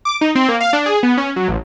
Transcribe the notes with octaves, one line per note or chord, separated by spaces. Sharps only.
D6
D#4
C4
A#3
F5
D4
G#4
B3
C#4
F#3
A1